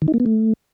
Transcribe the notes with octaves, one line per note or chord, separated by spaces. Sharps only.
D#3
D#4
A#3
B3
A3